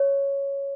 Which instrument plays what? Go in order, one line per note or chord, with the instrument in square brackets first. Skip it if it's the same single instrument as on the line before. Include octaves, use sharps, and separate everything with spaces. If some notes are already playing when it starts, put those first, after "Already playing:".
Already playing: [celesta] C#5